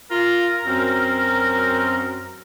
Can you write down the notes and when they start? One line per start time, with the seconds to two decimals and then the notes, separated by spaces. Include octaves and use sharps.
0.11 F4 A#4
0.65 F#2 C4